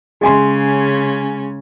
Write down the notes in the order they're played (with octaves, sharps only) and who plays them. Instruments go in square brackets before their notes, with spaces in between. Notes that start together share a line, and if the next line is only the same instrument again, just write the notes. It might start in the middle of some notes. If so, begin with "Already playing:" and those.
[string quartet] C#3 C#4 [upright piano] G#3 G#5 C6